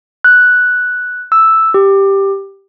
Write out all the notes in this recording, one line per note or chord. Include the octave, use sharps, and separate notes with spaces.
F#6
E6
G4